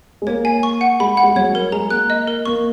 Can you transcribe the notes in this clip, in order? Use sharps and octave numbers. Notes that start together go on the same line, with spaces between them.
G#3
A#3 C#5
G#5
C#6
F#5
G#3 B5
F#5
G#3
F#3 C#5
A#4
G#3 A#5
A#3 F#6
D#5
A#4
A#3 C#6